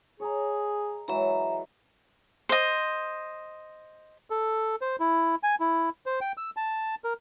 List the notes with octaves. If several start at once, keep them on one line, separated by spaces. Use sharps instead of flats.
G#4 C#5 D#5 A#5
E3 F#3 G#3 E5 A#5
C5 D#5
A4
C5
E4
G#5
E4
C5
G5
E6
A5
A#4